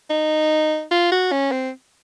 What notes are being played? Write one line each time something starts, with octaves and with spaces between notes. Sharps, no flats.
D#4
F4
F#4
C#4
C4